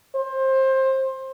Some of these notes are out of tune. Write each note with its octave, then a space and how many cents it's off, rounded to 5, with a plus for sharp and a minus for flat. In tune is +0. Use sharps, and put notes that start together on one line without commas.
C5 +20